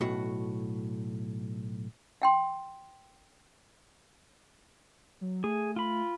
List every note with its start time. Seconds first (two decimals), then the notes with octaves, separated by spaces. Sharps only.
0.01 B1 A2 F#4
2.22 F5 G5 C6
5.21 F#3
5.44 A3 G#4
5.76 F4 B5